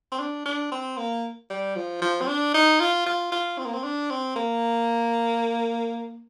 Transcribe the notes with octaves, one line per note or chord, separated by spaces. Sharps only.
C4
D4
D4
C4
A#3
G3
F3
F3
C4
D4
D#4
F4
F4
F4
C4
A#3
C4
D4
C4
A#3